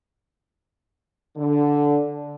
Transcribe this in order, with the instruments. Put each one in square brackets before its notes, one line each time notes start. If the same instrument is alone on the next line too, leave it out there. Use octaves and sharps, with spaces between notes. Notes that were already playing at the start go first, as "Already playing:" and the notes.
[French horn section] D3